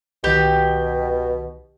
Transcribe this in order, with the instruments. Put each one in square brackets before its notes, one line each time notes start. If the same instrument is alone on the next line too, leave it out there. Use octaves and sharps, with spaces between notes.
[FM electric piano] C2 D#3 [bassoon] B2 [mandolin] G4